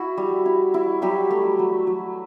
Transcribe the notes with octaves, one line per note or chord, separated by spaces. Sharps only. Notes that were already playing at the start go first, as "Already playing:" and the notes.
Already playing: E4 F#4
G3
E4
E4
F#3 G3 G4
A3
F#3
F#3